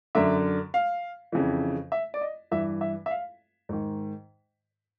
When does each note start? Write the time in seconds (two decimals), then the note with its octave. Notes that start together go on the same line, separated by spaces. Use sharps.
0.15 F#2 D3 E5
0.74 F5
1.32 F2 C#3 E3
1.92 E5
2.14 D5
2.21 D#5
2.51 G2 E3 E5
2.81 E5
3.06 E5
3.11 F5
3.69 G#2 D#3